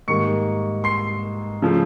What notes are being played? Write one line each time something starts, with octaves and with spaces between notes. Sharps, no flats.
G#2 D#3 G3 A#3 C#6 C#7
C6 C7
C#3 F3 A3